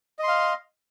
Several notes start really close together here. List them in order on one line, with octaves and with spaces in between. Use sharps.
D#5 C6 F5